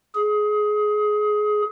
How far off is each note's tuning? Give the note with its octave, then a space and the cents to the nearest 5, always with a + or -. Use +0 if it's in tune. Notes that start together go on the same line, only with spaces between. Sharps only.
G#4 +20